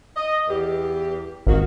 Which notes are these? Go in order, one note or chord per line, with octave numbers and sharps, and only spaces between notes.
D#5
E2 G4
G#1 D#3 A#3 F#4